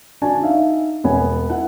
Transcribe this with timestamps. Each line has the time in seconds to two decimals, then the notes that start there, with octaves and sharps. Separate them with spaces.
0.22 D4 F#4 G#5 A5
0.42 D#4 E5 F5
1.04 E1 B3 C#5 G#5
1.50 E4 F#5